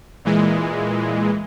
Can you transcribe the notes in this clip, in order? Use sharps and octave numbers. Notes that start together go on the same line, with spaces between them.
A#2 E3 G#3